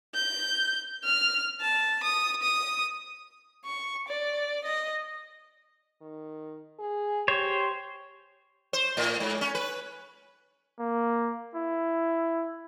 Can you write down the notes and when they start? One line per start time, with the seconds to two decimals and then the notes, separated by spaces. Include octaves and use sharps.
0.14 G6
1.04 F6
1.60 A5
2.03 D#6
2.42 D#6
3.65 C#6
4.08 D5
4.65 D#5
6.01 D#3
6.79 G#4
7.28 G4 C5 C#5
8.73 C5
8.97 A2
9.20 G#2
9.41 C#4
9.55 B4
10.79 A#3
11.55 E4